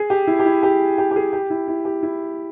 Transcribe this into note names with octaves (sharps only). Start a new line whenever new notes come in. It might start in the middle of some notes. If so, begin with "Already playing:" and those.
Already playing: G#4
G4
E4
G4
E4
G4
G4
G4
G#4
G4
E4
E4
G4
E4